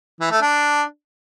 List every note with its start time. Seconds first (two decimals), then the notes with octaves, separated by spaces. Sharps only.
0.21 E3
0.31 A3
0.41 D4